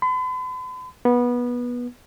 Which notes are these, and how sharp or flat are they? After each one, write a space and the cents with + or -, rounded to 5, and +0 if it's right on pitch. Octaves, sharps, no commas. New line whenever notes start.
B5 +45
B3 -20